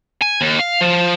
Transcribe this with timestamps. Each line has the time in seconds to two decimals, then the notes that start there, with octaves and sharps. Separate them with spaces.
0.21 G#5
0.41 D#2
0.59 F5
0.81 F3